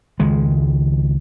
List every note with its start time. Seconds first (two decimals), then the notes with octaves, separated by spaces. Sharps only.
0.20 C#2 D#3 G#3